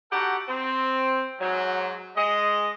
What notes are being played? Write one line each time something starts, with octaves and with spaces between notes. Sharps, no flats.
D#4 F#4 G4 A4 F#5
C4
G#2 F#3
G#3 D#5